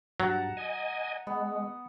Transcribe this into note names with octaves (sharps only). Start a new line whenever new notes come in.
G2 F#3 F#5 A5 A#5
D#5 G#5
G#3 B3